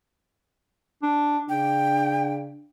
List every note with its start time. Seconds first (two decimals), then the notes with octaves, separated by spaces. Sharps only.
1.03 D4
1.49 C#3 D4 G5